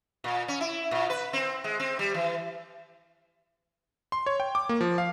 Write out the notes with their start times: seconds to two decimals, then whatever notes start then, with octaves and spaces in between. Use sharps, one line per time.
0.24 A#2
0.48 C#4
0.61 E4
0.91 A#2
1.10 B4
1.33 C4
1.64 G#3
1.80 C4
1.99 G3
2.14 E3
4.12 C6
4.26 C#5
4.40 G5
4.55 D6
4.69 A#3
4.81 F3
4.98 F5